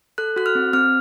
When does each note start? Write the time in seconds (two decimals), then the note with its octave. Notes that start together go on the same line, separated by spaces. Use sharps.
0.18 A4 F#6
0.36 F#4 F#6
0.46 F6
0.55 C4
0.73 C4 F6